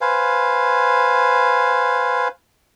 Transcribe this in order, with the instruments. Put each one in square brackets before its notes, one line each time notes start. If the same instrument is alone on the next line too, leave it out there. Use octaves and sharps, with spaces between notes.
[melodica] B4 C5 F5 G#5